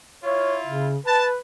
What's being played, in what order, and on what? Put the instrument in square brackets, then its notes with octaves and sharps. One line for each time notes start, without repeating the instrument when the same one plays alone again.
[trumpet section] E4 F4 [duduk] C#5
[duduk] C#3
[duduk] B4 [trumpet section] A5